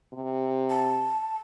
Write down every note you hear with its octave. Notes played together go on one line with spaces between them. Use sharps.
C3
A5